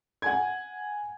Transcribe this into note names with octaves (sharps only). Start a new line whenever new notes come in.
F#5 G#5 G#6